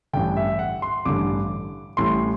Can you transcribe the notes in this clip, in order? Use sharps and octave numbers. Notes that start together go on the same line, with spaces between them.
A1 G2 D3 G5
E5
F#5
C6
A1 G2 D3 D6
A1 A2 G3 C6